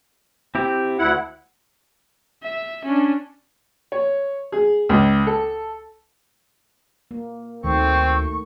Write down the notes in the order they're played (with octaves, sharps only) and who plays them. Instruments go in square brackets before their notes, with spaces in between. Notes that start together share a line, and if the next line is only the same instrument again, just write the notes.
[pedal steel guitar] C4 E4 G4
[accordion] D2 E4 F#5
[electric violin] E5
C#4 D4
[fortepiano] C#5
G#4
C#2
A4
[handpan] A#3
[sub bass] D2 [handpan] D#3 A3 [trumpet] C4 [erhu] C#6